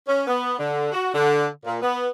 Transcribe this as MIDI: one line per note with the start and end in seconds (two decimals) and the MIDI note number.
0.08 0.25 61
0.27 0.54 59
0.58 0.89 50
0.92 1.09 66
1.14 1.46 50
1.65 1.79 46
1.82 2.08 59